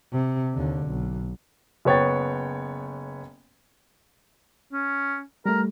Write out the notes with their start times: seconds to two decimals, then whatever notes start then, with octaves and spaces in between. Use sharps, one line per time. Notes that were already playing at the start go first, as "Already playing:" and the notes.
0.12 C3
0.54 D#2 D3
0.87 B1
1.85 F#1 B3 C#5 G5 A6
4.72 C#4
5.46 G3 A3 A#4